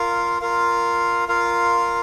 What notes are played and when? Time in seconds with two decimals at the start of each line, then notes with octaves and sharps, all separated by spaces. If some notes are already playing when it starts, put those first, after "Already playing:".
Already playing: F4 A#4 F5
0.41 F4 A#4 F5
1.28 F4 A#4 F5